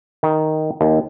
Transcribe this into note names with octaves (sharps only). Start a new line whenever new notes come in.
D#3
D#2